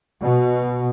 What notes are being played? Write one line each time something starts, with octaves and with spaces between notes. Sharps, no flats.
B2